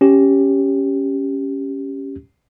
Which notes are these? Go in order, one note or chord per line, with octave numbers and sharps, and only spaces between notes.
C#4 G4